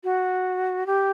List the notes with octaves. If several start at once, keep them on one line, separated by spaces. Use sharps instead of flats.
F#4
G4